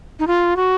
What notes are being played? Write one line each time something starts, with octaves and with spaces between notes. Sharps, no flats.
D#4
F4
F#4